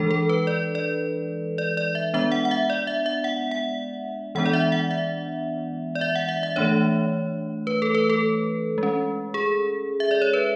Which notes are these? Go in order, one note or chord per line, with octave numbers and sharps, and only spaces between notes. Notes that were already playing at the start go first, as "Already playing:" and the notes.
Already playing: E3 G#3 D4 A4
A4
B4
D5
D5
D5
D5
E5
G#3 B3 D4 E5
F#5
F#5
E5
D5
E5
E5
F#5
F#5
E3 G#3 B3 D4 F#5
D5
E5
F#5
E5
D5
E5
F#5
E5
E5
E3 A3 D4 C#5
B4
A4
B4
A4
G#3 C#4
G#4
E5
D5
C#5
B4